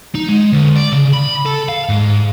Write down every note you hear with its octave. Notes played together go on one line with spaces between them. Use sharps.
D#4
G#3
D2
D5
C#3
B5
A4
F5
G#2